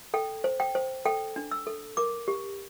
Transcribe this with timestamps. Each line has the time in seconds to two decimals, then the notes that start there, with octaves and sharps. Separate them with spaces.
0.14 A4 G5
0.44 C5
0.60 G5
0.75 C5
1.05 A4 G5
1.36 D4
1.51 E6
1.67 A4
1.97 A#4 D6
2.28 G4